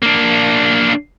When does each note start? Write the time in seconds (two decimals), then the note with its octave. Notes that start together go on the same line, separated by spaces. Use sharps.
0.02 A#3 D4